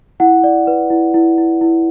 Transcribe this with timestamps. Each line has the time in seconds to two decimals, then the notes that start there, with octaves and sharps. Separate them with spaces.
0.20 E4 F#5
0.44 D5
0.67 B4
0.90 E4
1.14 E4
1.38 E4
1.61 E4